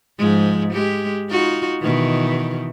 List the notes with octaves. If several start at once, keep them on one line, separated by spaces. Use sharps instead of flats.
G#2 F3 G#3
G#3 G4
D#4 F4 F#4
B2 D#3 E3